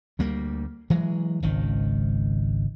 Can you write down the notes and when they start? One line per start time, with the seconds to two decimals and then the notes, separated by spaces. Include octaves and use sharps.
0.19 D2 G3 A#3
0.90 E3 F#3 G#3
1.43 G#1 C#2 D#3